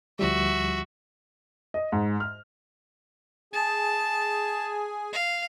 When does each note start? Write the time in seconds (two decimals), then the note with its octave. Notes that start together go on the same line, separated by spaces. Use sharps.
0.19 D2 F3 G3 F#4 E5
1.74 D#5
1.92 G#2
2.20 F6
3.53 G#4 G#5 A5
5.13 F5